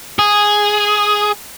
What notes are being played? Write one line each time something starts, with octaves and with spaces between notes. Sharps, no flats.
G#4